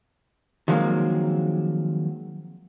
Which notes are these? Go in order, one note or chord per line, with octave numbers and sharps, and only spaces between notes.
D#3 F3 F#3 G#3 A#3 C4